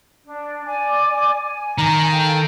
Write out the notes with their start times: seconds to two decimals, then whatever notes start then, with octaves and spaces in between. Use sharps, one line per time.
0.25 D4
0.65 D5 G#5 D6
1.43 G#5
1.78 D#3 A#5
2.10 A4 F5 G5